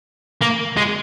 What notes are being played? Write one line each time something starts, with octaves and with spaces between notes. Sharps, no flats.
A#3
G#3